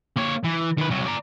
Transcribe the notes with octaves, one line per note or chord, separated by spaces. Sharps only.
A#3 C#5
E3
D#3 B4
C2 F#3
D5 A#5